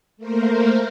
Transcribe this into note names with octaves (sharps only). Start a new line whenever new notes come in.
A3 A#3 A#4 C5